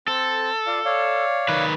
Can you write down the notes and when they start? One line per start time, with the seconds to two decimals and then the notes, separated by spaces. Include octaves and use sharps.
0.08 C4 A4
0.67 F4 D5 F5
0.85 C#5 D5 F5
1.48 D#3 B4